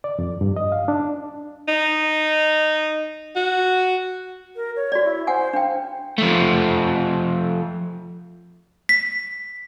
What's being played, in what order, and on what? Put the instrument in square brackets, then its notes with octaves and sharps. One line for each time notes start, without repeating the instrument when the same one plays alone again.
[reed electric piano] D5
F2
G2
D#5
F5
D4
[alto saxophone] D#4
F#4
[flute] A#4
C#5
[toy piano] F#4 D5
[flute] E4
[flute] C5 [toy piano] F#5 G#5
[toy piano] D4 G5 [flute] F5
[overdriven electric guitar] F3 A3
[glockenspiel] B6